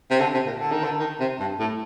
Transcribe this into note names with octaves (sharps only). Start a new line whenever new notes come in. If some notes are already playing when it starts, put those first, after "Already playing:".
C3
D3
C3
A#2
D3
D#3
D3
D#3
C3
G2
A2